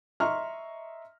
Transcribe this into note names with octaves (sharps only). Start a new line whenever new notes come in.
D#5 E5 A#5 C6 C#6 F6